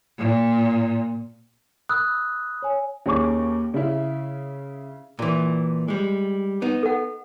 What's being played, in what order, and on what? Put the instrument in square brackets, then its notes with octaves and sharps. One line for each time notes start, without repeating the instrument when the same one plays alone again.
[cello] A#2
[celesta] B5 D#6 E6 F#6
C#5 G#5
[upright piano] D#2 C#4 G#4 C#6 D6
C#3 E4
[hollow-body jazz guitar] A#2 E3 [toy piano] D5
[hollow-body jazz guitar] G3 G#3
B3 D#4
[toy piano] A4 F#5